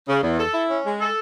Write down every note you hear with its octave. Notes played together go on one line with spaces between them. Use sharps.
C#3
E2
A4
E4
C#4
G#3
A4